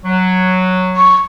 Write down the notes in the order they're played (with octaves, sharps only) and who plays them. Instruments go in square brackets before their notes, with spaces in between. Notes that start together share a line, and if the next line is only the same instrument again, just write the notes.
[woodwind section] F#3
[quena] C#6